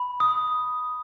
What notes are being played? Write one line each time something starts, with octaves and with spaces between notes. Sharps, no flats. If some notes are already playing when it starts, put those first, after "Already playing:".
Already playing: B5
D#6